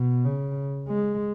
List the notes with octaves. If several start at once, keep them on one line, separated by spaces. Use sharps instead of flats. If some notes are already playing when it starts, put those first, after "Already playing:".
Already playing: B2
C#3
G#3